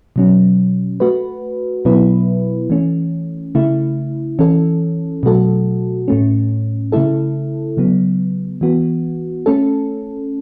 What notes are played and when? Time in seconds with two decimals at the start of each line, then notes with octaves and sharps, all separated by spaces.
0.16 B2 F#3 C#4
1.00 A3 F#4 B4
1.85 B2 F#3 B3 E4 B4
2.70 E3 A3 C#4
3.55 C#3 A3 E4
4.39 E3 C#4 A4
5.23 B2 F#3 A3 F#4 A4
6.08 A2 A3 C#4
6.92 C#3 A3 E4 A4
7.77 C#3 F#3 B3
8.61 E3 B3 F#4
9.46 A3 C#4 A4